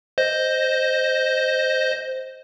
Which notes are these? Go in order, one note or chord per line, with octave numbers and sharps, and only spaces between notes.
C5 D#5